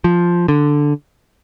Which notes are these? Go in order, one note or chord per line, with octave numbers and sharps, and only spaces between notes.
F3
D3